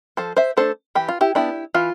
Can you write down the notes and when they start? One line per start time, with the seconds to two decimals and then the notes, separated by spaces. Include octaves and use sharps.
0.17 F3 A4 C5
0.36 C5 E5
0.57 A3 D4 A4 C5
0.95 E3 G4
1.08 F4
1.21 E4 G4
1.35 B3 D4 E4 G4
1.74 E3 F4